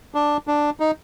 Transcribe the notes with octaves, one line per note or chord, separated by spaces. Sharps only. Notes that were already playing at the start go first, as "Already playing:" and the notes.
D4
D4
D#4